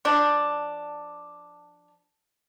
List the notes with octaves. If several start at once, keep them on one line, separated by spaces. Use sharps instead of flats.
F3 D4